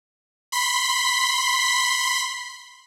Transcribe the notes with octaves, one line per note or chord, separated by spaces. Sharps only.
B5 C6 B6